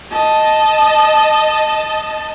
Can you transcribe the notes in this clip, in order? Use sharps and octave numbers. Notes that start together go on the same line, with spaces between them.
D#5 A5